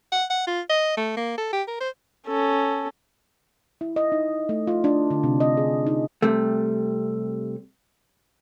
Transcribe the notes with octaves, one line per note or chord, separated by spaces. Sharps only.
F#5
F#5
F4
D#5
A3
A#3
A4
G4
A#4
C5
C#4 A4
E4
D#5
D#4
A3
F4
D4
D3
C3
D#5
G#4
D#4
C3 G3 A3